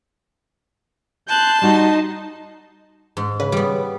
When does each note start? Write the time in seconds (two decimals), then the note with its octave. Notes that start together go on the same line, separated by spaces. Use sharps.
1.29 A5 C6 F#6 G6
1.62 G3 D#4 F#4
3.17 G#2
3.40 C#3 B4
3.52 G3 B3